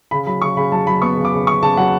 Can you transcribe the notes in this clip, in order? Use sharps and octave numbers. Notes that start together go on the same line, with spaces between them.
C#3 B5
F#3 B5
C#3 C#6
C#3 B5
F#3 A5
F#3 B5
B3 C#6
C#3
D6
C#3
C#3 C#6
C#3 A5
F#3 F#5